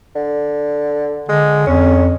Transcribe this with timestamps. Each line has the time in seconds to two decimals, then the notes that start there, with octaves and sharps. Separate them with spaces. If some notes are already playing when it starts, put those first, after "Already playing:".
0.15 D3
1.29 D3 G#3
1.67 F2 C#4